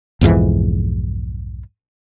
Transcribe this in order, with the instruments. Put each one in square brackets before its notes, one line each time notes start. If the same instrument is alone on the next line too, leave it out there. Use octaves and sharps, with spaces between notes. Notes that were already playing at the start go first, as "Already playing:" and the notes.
[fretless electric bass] B1 F2 G#2 E3